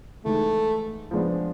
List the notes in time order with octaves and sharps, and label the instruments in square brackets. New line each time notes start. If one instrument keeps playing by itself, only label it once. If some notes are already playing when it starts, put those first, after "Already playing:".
[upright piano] G#2 E3 G#3 [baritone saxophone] A3
[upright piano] F3 G#3 B3 D4